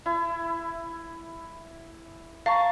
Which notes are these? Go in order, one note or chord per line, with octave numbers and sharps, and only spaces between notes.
E4
F5 A5 A#5 C#6